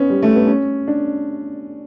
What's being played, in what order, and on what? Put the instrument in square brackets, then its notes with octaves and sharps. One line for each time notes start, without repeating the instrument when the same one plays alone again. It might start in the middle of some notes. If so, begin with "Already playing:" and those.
Already playing: [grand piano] B3 C#4
G3
A3
B3
C#4
D4